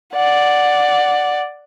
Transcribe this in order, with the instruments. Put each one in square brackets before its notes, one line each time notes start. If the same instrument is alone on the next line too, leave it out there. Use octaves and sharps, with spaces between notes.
[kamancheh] D5 F#5